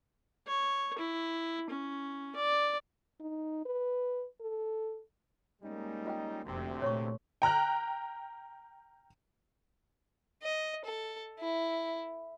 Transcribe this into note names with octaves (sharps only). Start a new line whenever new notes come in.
C#5
E4
C#4
D5
D#4
B4
A4
G3 G#3 A#3 C#4 D#4
F4 D#5 G5
F1 D2 C3 C4
A#2 A3 C#5 C6 C#6
G5 A#5 F6 F#6
D#5
A4
E4